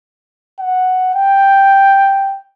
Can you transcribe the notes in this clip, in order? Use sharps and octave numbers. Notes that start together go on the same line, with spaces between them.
F#5
G5